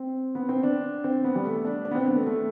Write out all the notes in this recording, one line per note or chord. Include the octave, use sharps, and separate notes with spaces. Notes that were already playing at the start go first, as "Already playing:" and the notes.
Already playing: C4
B3
C4
D4
C4
B3
G3
A3
D4
D4
B3
C4
B3
A3
A3